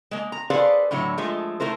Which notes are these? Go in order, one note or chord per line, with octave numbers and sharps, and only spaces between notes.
G#3 A#3
A#5
G#4 A4 B4 C5 D5 F5
A2 D3 F#3 E4 C#5
F3 G#3 A3
A3 E4 A#4 C5